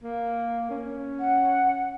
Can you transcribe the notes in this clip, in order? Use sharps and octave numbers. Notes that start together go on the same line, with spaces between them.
A#3
C#4
F#5